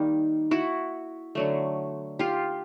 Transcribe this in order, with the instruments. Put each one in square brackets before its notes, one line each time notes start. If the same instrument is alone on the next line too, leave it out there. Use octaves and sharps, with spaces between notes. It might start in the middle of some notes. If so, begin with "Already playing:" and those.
Already playing: [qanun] D#3 G3 A#3 D#4
E4 F#4
D3 F#3 A3
F4 G4